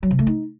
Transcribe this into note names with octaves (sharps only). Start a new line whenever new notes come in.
F#3
C3
A3
D#4